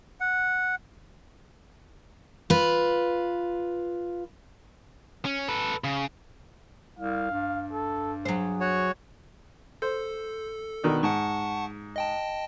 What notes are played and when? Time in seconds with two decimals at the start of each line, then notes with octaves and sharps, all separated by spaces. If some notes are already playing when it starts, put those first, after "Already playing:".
0.20 F#5
2.50 F4 B4
5.25 C#4
5.48 A4 B4
5.84 C#3
6.99 C2 F5
7.31 G2
7.72 A4
8.25 F#3 G#4 C5
8.60 F#4 C#5
9.82 A4 C5
10.84 B2 D#3 D4
11.03 G#2 F#5 A5 C#6
11.96 D#5 G5 A5